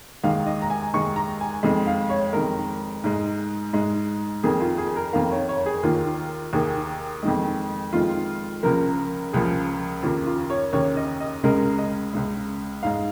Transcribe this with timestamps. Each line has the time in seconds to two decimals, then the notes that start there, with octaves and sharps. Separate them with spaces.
0.24 D#2 D#3 G#3 F5
0.46 D#5
0.62 A#5
0.70 G#5
0.94 D#2 D#3 G#3 C#6
1.16 A#5
1.41 G#5
1.63 F2 D#3 G#3
1.87 F5
2.10 C#5
2.33 F2 D#3 G#3 A#4
3.04 G#2 G#3
3.73 G#2 G#3
4.43 F2 D#3 A#3 G#4
4.61 F4
4.78 G#4
4.96 A#4
5.13 F2 D#3 A#3 F5
5.31 C#5
5.49 C#5
5.66 G#4
5.83 D#2 D#3 A#3 F4
6.53 D#2 D#3 A#3 G#4
7.23 F2 D#3 G#3
7.93 F2 D#3 G#3 F4
8.63 C#2 C#3 F3 A#3 A#4
9.33 C#2 C#3 F3 A#3 G#4
10.03 D#2 C#3 A#3 F4
10.26 F4
10.50 C#5
10.73 D#2 C#3 A#3 C#5
10.97 D#5
11.20 D#5
11.43 C#2 C#3 G#3 A#4
11.78 D#5
12.13 C#2 C#3 G#3
12.83 G#2 G#3 F5